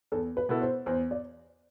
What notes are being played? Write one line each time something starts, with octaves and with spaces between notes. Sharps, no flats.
E2 A4
B4
B2 B3 E4 A4
C5
E2 C5
D5